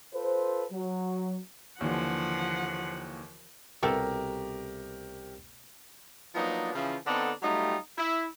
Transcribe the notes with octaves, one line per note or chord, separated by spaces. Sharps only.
F4 A4 B4 C5
F#3
D#2 D3 E3 F3 F#5
C2 B2 A3 G4 A4 A#4
F3 F#3 A#3 B3 D4 D#4
C#3 E3 F3
D3 B3 C4 D4 D#4 A4
F#3 G3 A3 D#4 F4 G4
E4